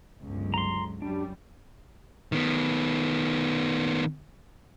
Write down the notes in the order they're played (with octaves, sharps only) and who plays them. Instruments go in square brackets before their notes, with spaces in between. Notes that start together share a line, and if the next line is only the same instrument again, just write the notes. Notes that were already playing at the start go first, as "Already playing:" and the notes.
[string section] G1 C#2 F#3
[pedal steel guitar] A#5 C6
[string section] F#2 G3 [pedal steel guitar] D4
[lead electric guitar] D#3 B3